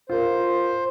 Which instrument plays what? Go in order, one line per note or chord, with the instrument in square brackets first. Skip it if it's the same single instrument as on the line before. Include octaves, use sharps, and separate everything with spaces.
[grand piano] F4 A#4 [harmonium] C5